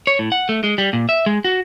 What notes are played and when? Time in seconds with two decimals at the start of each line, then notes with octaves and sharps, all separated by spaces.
0.07 C#5
0.19 A2
0.32 F#5
0.49 A3
0.64 G#3
0.78 G3
0.93 A#2
1.09 E5
1.26 G#3
1.45 F#4